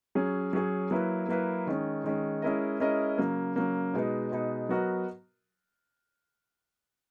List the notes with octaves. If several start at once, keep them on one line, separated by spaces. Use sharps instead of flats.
F#3 C#4 G#4
F#3 C#4 G#4
F#3 A#3 E4 B4
F#3 A#3 E4 B4
D#3 G#3 C#4
D#3 G#3 C#4
G#3 C#4 E4 A#4 D#5
G#3 C#4 E4 A#4 D#5
C#3 F#3 A#3
C#3 F#3 A#3
B2 G#3 B3 D#4
B2 G#3 B3 D#4
F#3 B3 F#4 A#4 D#5